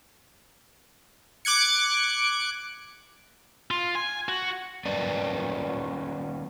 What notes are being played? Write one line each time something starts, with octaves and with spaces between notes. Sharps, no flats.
D6 F#6 G#6 C#7
F4
G#5
F#4
G3 A#3 C#4 B4 D5